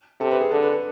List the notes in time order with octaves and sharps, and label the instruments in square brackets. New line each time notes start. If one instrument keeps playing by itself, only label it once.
[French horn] C3 [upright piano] A4
[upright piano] B4
G#4
[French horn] D3 [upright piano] A4
[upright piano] B4
A4